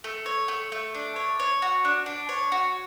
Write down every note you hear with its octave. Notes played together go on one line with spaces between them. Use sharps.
A3
C#5
A3
A3
D4
C#5
C#5
F#4
D4
D4
C#5
F#4